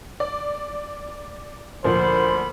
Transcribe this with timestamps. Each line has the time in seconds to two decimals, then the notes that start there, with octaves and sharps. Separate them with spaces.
0.20 D5
1.84 D2 A#2 F3 C5 B5